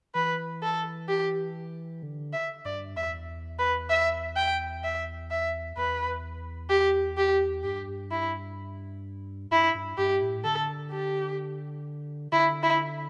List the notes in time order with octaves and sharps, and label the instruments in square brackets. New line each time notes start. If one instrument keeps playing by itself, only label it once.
[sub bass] E3 [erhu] B4
[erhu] A4
G4
[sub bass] D3
[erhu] E5
[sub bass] G2 [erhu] D5
[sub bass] E2 [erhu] E5
[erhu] B4
E5
G5
E5
E5
[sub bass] E2 [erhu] B4
[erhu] G4
G4
[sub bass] G2 [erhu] G4
[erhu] E4
[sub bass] G2 [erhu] E4
[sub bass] G2
[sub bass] G2 [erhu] G4
[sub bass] A2
[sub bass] D3 [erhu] A4
[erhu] G4
[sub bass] D3 [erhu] E4
[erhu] E4